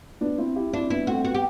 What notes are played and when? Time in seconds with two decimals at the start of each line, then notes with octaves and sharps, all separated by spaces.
0.21 B3 D4
0.38 C4 E4
0.56 E4 G4
0.73 C4 D4 E4
0.90 B3 D4 E4
1.07 A3 C4 F#4
1.25 B3 F#4
1.34 G4